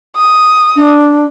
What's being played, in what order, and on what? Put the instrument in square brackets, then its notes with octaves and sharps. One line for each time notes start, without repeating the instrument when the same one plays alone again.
[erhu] D#6
[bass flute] D4